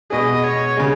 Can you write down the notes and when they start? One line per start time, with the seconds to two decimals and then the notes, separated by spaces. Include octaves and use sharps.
0.10 B2 G#3 B3 G#4 D#5
0.44 C#5
0.77 C#3 G#3